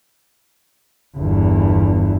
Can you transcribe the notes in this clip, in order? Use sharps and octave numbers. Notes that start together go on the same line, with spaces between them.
G1 E2